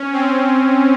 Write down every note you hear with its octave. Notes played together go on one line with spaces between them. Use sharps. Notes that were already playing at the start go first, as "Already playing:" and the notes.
Already playing: C#4
C4